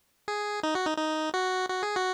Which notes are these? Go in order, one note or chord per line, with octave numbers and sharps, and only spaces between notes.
G#4
D#4
F#4
D#4
D#4
F#4
F#4
G#4
F#4